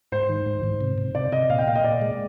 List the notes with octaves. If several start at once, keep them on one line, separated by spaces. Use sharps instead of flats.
G#2 C5
D#3
G#2
G#2
C3
C3
C3 D5
C3 D#5
A#2 F5
G5
A#2 F5
D#5
A#2 D5
G#3